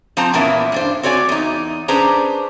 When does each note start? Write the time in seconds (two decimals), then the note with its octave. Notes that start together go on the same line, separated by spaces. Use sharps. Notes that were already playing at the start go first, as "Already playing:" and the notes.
0.17 F3 C4 C5 A5 A#5
0.33 A#2 E3 A#3 B3 C#4 E4
0.72 G2 D4 C5
1.03 C4 F#4 C#5 D5 G#5
1.29 E2 D#4
1.88 C#4 D4 G#4 B4 C5 A#5